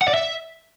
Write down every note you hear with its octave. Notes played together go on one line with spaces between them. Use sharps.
F#5
D5
E5